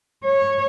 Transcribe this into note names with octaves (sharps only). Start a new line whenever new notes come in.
C#5